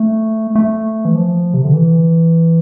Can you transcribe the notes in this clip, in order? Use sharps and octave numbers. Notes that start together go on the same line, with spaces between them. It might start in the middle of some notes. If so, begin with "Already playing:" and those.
Already playing: A3
A3
E3
F3
C3
D3
E3